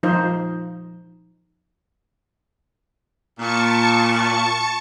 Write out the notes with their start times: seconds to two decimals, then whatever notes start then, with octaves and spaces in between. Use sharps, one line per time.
0.03 F3 D#4 C5
3.39 A#2 A5 C#6 C#7